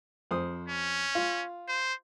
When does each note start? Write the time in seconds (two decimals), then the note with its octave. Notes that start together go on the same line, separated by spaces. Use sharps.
0.31 F2 C5 D#6
0.68 C#4
1.15 F4
1.68 C5